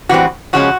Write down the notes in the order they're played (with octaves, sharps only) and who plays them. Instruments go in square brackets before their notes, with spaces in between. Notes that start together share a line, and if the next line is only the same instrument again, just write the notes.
[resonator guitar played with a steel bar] A2 E3 G3 C4 F#4
C#3 F3 G#3 C#4 F#4